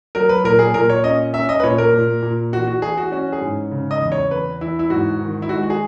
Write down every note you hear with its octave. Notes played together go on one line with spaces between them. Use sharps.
F#3 A#4
B4
A#2 A#4
G#4
A#2 A#4
C#5
C#4 D#5
C#4 E5
D#5
B4
A#2 C#5
A#4
A#2
A#2
E3 F#4
F#4
E3 G#4
F#4
C#4 F#4
G#4
G#2
C#3
D#5
E2
C#5
E2 B4
E3 E4
E4
G#2 F#4
D#3
E4
G#3 F#4
F#4
G#4